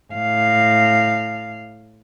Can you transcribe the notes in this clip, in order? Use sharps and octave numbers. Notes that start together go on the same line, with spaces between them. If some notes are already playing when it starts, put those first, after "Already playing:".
A2 F5